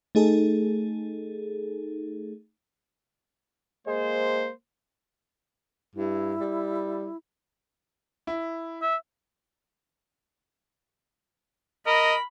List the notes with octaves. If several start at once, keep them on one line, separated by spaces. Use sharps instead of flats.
A3 D#4 G#4 A4
G#3 A#3 C5
G2 E4
G3
E4
E5
A#4 D#5 B5